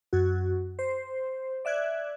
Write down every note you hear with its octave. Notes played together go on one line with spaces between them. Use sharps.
F#2 F#4
C5
D5 E5 F#6 G#6